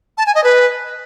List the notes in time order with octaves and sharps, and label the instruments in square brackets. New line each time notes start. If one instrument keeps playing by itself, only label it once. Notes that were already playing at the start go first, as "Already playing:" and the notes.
[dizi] A5
G#5
D#5
B4